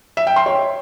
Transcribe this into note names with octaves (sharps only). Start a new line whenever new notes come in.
E5
G5
C6
C#5